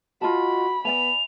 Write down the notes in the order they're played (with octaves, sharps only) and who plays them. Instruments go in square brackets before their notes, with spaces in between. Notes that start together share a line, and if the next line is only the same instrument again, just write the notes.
[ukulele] F4 D#5 A5 [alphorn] F#4 [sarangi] B5
[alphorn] B3 [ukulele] D5 E5 G#5 [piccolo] F7